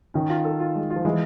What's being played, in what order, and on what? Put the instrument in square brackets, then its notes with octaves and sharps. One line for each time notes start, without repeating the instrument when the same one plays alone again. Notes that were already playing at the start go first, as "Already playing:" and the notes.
[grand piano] D#3 [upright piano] C#4
[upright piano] F4
A4
F4
G#3
F4
[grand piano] F3
[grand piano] E3 [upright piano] G#3